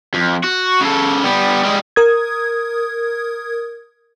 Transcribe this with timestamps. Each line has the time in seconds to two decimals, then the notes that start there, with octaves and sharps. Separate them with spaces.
0.14 F2
0.44 F#4
0.81 C#3 A4
1.24 G3 B3
1.63 G3 G#3
1.96 A#4 D#6 G#6